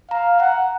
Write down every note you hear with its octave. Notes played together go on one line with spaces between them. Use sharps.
F5 A#5
F#5 A#5